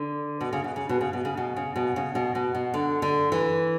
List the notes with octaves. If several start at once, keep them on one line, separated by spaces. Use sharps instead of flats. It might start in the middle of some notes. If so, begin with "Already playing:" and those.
Already playing: D3
B2
C#3
B2
C#3
B2
C#3
B2
C#3
B2
C#3
B2
C#3
B2
B2
B2
D3
D3
E3